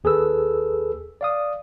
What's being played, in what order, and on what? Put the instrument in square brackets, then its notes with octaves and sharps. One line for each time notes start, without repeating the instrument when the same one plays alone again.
[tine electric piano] D#2 G#4 A4 B4 E6
D5 F5 D#6